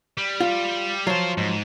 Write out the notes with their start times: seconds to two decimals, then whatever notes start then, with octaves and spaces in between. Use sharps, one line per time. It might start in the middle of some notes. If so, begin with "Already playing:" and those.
0.18 G3
0.40 F4
1.07 F3 F#3 F4 C5
1.38 G#2